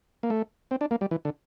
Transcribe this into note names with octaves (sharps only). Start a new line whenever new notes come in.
A#3
A3
C4
D4
A#3
G3
E3
D3